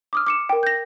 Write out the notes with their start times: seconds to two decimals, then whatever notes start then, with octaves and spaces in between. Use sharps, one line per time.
0.13 D6 D#6 F6
0.27 D6 C#7 E7
0.49 A#4 G5
0.63 G6 A#6